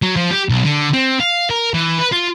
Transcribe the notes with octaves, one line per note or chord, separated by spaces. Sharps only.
F#3
F3
G4
B1
D3
C4
F5
A#4
E3
B4
F4